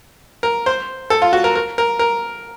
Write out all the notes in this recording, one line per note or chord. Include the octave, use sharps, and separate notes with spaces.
A#4
C5
A4
F4
F#4
A#4
A#4
A#4
A#4